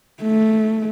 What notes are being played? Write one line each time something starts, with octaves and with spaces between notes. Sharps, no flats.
A3